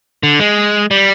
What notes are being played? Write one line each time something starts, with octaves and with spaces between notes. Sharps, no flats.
D3
G#3
G3